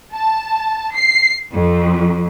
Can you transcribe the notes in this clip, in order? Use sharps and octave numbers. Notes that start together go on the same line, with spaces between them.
A5
C7
F2